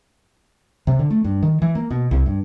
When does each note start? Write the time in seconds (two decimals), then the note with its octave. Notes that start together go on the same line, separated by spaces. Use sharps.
0.87 C3
0.99 D3
1.10 A3
1.24 G2
1.43 D#3
1.62 E3
1.75 A#3
1.90 B2
2.11 C2
2.26 G2